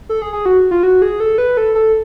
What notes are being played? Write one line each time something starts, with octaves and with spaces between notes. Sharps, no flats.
A4
G#4
G#4
F#4
F4
F#4
G#4
A4
B4
A4
A4